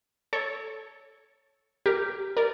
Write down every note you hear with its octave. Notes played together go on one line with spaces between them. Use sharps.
A4 C#5
G4 A#4
A#4 D5